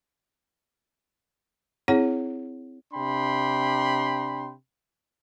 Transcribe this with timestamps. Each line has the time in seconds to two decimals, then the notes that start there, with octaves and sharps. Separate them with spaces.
1.88 C4 E4 G#4 C#5 F#5
2.94 C3 D4 G5 B5 C6